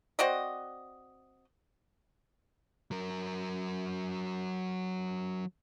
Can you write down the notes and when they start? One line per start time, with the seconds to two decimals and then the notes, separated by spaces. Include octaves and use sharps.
0.19 C4 F#4 D5 D#5
2.91 F#3 A#4